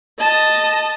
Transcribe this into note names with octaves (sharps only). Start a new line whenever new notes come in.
D#5 A5